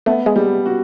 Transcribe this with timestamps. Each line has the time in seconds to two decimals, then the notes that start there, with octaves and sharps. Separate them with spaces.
0.06 A3 B3
0.26 G#3
0.36 G3
0.66 F#4